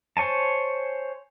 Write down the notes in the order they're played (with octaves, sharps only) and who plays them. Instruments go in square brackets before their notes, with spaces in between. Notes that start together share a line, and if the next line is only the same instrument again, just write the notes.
[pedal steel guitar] C5 C#5 G#5 A5